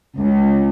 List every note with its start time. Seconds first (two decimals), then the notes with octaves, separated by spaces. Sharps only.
0.19 C#2